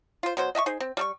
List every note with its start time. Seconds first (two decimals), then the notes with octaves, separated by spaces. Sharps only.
0.23 F4 C5
0.37 B2 F#3 C5
0.55 D#5 E5 G#5 C#6
0.66 D#4 G#4 C5
0.80 C4
0.97 G3 A4 C#6